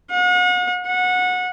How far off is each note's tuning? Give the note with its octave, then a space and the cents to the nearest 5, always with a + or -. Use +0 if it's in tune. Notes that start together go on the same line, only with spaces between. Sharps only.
F#5 -40
F#5 -20